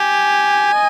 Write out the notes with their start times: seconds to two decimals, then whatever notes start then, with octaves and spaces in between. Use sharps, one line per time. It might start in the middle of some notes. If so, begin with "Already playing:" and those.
Already playing: G4 G#5
0.74 D#5